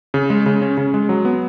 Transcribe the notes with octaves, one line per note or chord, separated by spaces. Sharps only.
C#3
G#3
C#3
C#4
C#3
G#3
F#3
B3